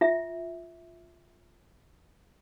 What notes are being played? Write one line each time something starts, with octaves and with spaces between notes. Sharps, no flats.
F4 E5